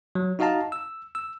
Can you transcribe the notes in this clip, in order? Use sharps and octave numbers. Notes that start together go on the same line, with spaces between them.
F#3
D#4 F#4 D#5 F5 A5 A#5
E6
E6